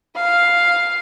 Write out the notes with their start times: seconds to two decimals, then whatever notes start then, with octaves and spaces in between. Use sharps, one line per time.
0.16 F5